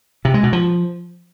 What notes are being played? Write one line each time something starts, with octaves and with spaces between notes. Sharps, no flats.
C3
G#3
B2
F3